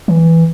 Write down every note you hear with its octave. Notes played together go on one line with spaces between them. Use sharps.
E3